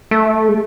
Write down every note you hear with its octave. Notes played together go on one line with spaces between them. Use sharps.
A3
G#3